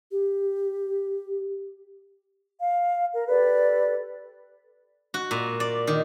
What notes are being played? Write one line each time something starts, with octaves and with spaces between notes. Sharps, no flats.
G4
F5
A#4
G4 A4 B4 D5
F#4
A#2
D5
D#3